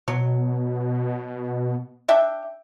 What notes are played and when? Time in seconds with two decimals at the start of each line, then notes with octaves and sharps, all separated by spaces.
0.08 B2 F#3
2.08 D4 E5 G5